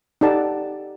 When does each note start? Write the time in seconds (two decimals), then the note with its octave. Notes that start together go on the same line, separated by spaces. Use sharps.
0.21 D#4 G4 A4 D5 F#5 A5